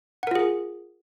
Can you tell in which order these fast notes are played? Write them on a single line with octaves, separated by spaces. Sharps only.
F#5 A#4 F4 G#4